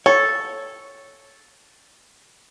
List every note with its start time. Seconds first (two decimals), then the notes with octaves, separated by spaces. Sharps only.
0.06 A4 C#5